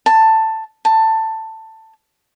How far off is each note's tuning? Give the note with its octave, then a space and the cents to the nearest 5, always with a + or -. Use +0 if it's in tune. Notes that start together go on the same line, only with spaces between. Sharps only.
A5 +10
A5 +15